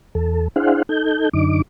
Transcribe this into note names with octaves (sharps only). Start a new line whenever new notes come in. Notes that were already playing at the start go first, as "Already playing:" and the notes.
E2 A4
D4 E4 G#4 C5 F5 F#5
D#4 A4 G6
F#2 D3 D#4 D6